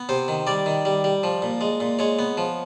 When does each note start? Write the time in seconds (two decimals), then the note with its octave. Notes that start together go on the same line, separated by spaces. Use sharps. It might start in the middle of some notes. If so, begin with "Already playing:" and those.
Already playing: B3
0.09 C3 C5
0.28 D#3
0.47 G3 D5
0.66 D#3
0.85 G3
1.04 G3
1.23 F3
1.42 A#2
1.61 G#3
1.80 A#2
1.99 G#3 C#5
2.19 B3
2.37 F3